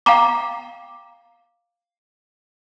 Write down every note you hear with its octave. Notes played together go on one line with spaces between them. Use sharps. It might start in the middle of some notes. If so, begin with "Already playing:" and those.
F5 G5 A#5 D6